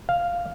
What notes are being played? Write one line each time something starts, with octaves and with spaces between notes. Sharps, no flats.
F5